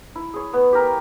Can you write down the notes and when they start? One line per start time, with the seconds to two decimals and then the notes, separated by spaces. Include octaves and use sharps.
0.15 E4
0.34 G#4 C#5
0.53 B3
0.73 G4 A#4